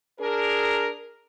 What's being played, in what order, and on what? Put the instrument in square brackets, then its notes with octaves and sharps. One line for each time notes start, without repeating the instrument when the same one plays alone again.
[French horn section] D4 G#4 A#4